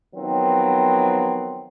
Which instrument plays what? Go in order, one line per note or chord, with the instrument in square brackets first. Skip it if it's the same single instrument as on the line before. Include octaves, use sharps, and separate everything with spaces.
[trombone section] D#3 F3 F#3 B3 C4